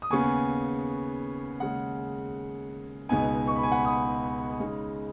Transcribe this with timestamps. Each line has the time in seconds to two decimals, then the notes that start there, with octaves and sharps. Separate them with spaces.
0.02 D#6
0.10 D#2 C#3 B3 G#5 C#6
1.60 D#2 C#3 G#3 F#5
3.09 C#2 B2 B3 D#4 G#5
3.47 C#6
3.56 B5
3.63 G#5
3.72 F#5 B5
3.85 B5 D#6
4.60 C#3 G#3 D#4